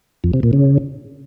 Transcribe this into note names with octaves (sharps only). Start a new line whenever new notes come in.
F2
C3
A#2
C#3